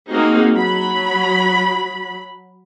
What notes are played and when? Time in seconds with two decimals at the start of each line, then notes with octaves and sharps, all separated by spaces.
0.10 A#3 C4 D#4 F#4 G#4
0.53 F#3 B5